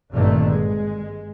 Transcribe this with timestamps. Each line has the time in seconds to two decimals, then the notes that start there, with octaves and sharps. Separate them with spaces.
0.13 G#1 G2 A#2 D3 D#3 A3
0.48 G#3